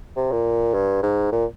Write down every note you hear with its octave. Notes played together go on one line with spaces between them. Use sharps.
C3
A#2
G2
G#2
A#2